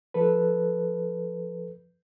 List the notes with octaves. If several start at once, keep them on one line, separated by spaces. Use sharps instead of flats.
F3 A4 B4